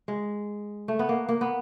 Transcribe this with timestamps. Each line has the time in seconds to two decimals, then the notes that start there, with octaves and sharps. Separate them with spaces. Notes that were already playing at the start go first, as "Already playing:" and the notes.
0.08 G#3
0.88 A3
0.99 B3
1.09 A#3
1.29 A#3
1.41 B3